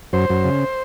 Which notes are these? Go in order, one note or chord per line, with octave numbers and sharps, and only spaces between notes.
F#2 C5
F#2
C#3